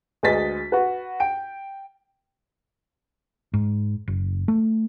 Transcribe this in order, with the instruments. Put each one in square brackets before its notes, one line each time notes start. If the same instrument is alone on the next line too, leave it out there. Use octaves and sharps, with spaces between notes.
[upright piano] D2 G#3 B4 D#5 A6 B6
F#4 B4
G5 D7
[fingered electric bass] G#2
F#1
A3